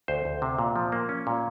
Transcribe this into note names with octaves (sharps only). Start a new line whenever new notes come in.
D2 C5
D2
C3
A#2
F3
A#3
C#4
A#2